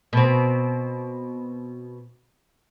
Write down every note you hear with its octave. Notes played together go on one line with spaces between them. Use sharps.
B2 C4